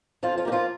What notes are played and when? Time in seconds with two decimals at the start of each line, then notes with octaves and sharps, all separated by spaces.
0.23 F2 F3 F4
0.37 F3 F4
0.45 D#3 A#3 G4
0.52 F3 F4